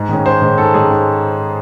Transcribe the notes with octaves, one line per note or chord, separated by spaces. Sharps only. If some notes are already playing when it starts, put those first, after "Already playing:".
Already playing: G#2
D#3 G#3 C#4
G#2 C5
D#3 G#3 C#4
G#2 A4
D#3 G#3 C#4 G#4
G#2